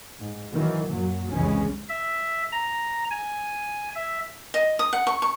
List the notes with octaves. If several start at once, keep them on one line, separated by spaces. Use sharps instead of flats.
G#2
D#3 E3 F#3
F#2 A#2 F#3
C2 F2 C#3 E3 G#3 C#4
E5
A#5
G#5
E5
D#5
D#6
F#5
C#6
C#6